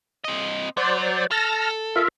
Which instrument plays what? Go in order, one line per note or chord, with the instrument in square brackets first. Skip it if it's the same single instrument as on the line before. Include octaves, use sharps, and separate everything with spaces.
[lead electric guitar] C4 D#5
[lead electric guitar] F#3 [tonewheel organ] C5 D5
[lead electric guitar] A4 [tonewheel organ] A5 F6 A#6
[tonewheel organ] F4 A#4 E5